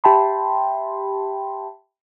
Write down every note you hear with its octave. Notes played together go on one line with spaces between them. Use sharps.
G4 E5 G5 A5 B5 C6